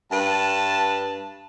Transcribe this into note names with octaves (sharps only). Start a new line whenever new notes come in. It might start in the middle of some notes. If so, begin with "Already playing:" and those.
G2 B4 A5